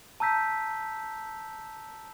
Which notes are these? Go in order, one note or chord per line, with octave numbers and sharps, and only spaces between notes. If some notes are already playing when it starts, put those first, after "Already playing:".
A5 A#5 E6 G6 B6